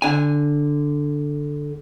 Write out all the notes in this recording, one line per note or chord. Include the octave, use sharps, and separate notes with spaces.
D3 G#5